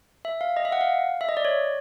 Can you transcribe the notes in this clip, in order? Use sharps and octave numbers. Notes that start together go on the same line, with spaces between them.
E5
F5
D#5
E5
F#5
F5
E5
D#5
D5
C#5